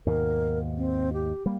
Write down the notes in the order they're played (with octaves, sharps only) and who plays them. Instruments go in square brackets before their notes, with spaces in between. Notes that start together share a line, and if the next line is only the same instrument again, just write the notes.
[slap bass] D#2 G#2 B2 [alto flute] A#4
[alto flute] C4
G4
[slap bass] G3 A#3